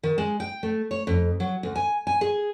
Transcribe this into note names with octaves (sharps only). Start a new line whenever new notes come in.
D#3
G#3
G5
A3
C#5
F2
F#3
D2
G#5
G#5
G#4